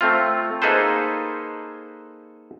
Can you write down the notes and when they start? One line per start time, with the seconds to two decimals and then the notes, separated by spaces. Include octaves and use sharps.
0.01 A3 C4 F4
0.62 A#3 D#4 G#4 A4 B4 C5